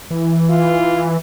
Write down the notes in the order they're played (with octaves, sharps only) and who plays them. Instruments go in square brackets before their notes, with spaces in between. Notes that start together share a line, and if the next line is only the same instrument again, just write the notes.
[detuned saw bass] E3
[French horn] F4